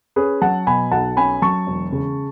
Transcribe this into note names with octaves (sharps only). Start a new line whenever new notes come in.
C#4 G#4 B4
F#3 F#5 A5
B2 G#5 B5
B1 F#5 A5
C#4 G#5 B5
F#3 A5 C#6
E1
C#3